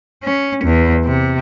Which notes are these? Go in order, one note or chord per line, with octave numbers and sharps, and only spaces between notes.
C#4
E2
C3